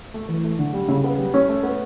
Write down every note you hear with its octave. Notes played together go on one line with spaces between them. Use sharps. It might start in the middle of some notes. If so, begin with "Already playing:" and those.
A3
E3
A3
D3
G3
C#3
B3
G3
C#4
A3
B3